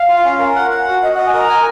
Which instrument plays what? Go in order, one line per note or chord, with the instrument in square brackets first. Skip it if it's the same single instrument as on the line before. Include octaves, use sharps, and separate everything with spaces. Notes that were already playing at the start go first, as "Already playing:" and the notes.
Already playing: [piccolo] F5
[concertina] F4
C#4
A#4
F#5
F#5
F#4
[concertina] F#4 [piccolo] D#5
[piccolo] F#5
[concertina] D#5
[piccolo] G#5
[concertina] A#4 [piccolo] A#5
[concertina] G#5